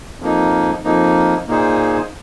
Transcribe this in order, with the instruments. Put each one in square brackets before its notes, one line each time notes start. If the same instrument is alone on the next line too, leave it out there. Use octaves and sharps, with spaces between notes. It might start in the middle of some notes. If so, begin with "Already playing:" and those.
[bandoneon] F2 F3 A#3 D#4
F2 F3 A#3 D#4
A#2 A#3 D#4 G#4 C5